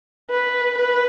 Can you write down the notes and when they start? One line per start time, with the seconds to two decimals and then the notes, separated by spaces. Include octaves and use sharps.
0.30 B4
0.78 B4